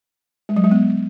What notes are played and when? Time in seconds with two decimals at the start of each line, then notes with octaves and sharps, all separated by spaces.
0.49 G#3
0.57 F#3
0.64 G#3
0.71 B3